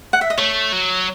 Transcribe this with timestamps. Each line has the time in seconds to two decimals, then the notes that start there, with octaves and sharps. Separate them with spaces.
0.13 F#5
0.21 E5
0.30 D#5
0.38 A3 C#5
0.72 F#3